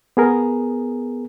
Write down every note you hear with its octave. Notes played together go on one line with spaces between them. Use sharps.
B3 G#4 A#4